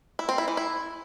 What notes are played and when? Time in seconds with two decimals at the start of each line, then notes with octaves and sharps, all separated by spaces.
0.19 E4
0.29 C4
0.38 E4
0.48 E3
0.57 E4